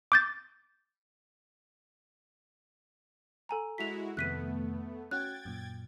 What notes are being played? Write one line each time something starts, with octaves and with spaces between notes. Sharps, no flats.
D6 G6 A6
A4 G#5 A#5
G#3 E4 F#4 B6 F7
F2 C3 D#3 A3 B3 F#6 B6 D#7
C#4 F#4 G5 F#6 G#6 A6
F#2 A#2